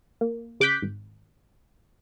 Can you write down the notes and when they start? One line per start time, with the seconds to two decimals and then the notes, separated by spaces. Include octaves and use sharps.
0.21 A#3
0.60 C#3 D6 F#6 G6 B6
0.82 G#1